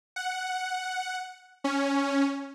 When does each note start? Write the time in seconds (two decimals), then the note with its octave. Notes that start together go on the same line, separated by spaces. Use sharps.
0.16 F#5
1.64 C#4